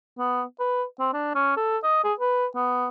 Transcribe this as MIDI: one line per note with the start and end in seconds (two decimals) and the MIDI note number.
0.18 0.43 59
0.59 0.84 71
0.99 1.09 60
1.13 1.34 62
1.35 1.55 61
1.57 1.78 69
1.83 2.00 75
2.04 2.13 68
2.19 2.46 71
2.55 2.88 59